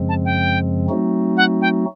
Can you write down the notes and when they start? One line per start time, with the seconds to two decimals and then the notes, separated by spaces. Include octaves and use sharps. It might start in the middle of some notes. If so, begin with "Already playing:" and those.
Already playing: F#2 C#3 F3 G#3 C4
0.09 A5
0.25 G5
0.89 F#3 A3 C4 D#4 F#4
1.37 F#5
1.61 G5